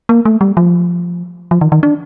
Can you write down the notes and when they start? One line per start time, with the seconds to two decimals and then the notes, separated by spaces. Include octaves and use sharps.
0.09 A#3
0.25 A3
0.41 G3
0.57 F3
1.51 F3
1.61 D#3
1.72 D#3
1.83 D4